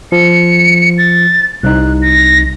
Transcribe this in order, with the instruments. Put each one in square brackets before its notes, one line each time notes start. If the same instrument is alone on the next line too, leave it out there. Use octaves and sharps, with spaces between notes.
[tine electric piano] F3 [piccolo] C#7
[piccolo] A6
[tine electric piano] C2 D#4 [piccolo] F#6
[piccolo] A#6